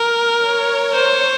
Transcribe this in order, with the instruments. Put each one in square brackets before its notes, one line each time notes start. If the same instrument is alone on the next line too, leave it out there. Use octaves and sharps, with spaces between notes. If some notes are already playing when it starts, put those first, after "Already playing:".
Already playing: [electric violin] A#4
[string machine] C#5
[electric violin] C5